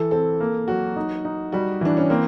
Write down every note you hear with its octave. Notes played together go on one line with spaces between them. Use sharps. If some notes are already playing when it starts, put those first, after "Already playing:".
Already playing: E3 A4
C4 A4
A#3
F#3 F#4
D#4
D#4
G3 F#4
E3 D4
C#4
A#3 C4